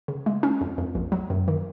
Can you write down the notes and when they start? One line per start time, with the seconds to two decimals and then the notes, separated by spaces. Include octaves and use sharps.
0.08 C#3
0.26 G#3
0.43 C#4
0.61 F2
0.78 F2
0.95 A#1
1.12 F#3
1.30 F#2
1.48 D#3